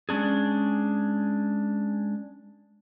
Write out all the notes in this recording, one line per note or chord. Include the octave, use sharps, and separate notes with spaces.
G#3 C#4 D4 G#4